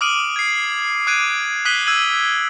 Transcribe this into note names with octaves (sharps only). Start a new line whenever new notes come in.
D6 D#6 F6 D7 D#7 F#7
G#6 C7
D6 F#6 G#6 D7 D#7
D#6 F#6 B6 D#7 F#7 G7
E6 G#6 D#7 F#7